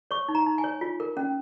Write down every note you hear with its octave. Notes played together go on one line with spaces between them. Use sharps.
C#5 C#6
D#4
A#5
D#4
G#5
C#5
F4
A#4
C#4